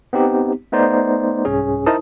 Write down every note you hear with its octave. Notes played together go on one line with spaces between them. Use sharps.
B3 C4 D#4 G4
A3 B3 D#4 C5 D5
C2 G#2 C#4 G#4
D#4 E4 A#4 C5 A5 D#6